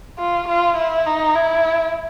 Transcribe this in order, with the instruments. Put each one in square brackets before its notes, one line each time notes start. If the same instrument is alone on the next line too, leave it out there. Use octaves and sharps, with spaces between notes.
[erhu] F4
F4
E4
D#4
E4